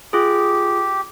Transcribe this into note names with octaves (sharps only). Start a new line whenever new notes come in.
F4 G4 G#4